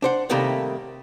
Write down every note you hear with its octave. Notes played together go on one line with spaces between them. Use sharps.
D4 C5 F#5
A2 C3 D#3 G3 A3 A#3